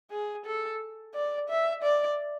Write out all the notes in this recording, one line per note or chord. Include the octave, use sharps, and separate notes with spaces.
G#4
A4
D5
E5
D5